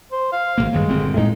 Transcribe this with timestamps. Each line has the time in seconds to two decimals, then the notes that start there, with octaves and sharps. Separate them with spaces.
0.12 C5
0.32 F5
0.58 G#1 E2 A#3
0.73 G2 D#3 F#3 G#3
0.88 G1 A#2 C4
1.17 A2 G#3 D#4